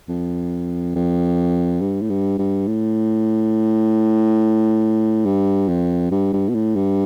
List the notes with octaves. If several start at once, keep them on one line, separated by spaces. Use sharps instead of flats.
F2
F2
G2
A2
G2
G2
A2
G2
F2
G2
G2
B2
A2
G2